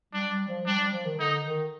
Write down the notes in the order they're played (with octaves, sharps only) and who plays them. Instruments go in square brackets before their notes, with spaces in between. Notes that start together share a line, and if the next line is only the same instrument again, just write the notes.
[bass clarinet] G3 [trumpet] D4
[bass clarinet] G3
F3
[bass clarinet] G3 [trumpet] D4
[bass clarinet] G3
F3
D#3
[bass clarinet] D3 [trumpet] D#4
[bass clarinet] D#3